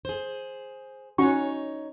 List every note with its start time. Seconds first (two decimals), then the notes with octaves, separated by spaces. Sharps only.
0.05 G#4 C5
1.18 C#4 D#4 F#4 C#5 C#6